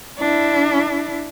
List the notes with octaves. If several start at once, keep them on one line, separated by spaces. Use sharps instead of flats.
D4 E4